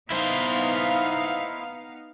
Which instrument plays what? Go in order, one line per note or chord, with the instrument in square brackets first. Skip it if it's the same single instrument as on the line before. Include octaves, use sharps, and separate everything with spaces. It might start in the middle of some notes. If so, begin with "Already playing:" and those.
[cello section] B3 D#4 F5 [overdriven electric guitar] E4 C5